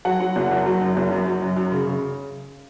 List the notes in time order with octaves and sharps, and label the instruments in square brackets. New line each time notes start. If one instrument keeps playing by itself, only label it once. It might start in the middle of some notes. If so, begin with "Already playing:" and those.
[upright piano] F#3 F#5
F#3
F#1
F#1
F#3
F#2
F#1
F#2
F#3
F#2
F#2
C#3
C#3